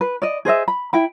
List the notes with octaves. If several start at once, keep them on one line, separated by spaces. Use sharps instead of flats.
B4
D5 D#5
G#4 C5 D#5 E5
B5
E4 G5 B5